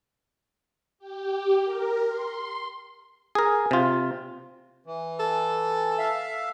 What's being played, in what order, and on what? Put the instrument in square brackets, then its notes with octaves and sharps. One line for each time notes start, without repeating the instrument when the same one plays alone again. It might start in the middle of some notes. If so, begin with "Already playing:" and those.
[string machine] G4
A#4
C6
[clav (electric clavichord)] G#4 A#4
C3 F4
[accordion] E3
[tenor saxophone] A4
[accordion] E5 F5